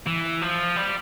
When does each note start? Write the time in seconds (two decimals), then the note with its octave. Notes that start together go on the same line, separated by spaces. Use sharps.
0.06 E3
0.42 F3
0.76 G3